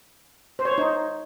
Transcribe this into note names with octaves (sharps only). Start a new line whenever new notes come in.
C5
C#5
C5
D#4